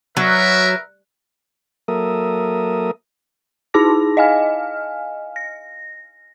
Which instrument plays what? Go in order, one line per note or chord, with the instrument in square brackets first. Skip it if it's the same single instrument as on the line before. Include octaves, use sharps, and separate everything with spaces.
[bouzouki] F#3 [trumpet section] A#4 B4 E5
[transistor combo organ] F#3 A#3 A4 A#4 E5 D#6
[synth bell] D#4 E4 G#4 A5 D6 A#6
D#5 F5 G#5 F6
A#6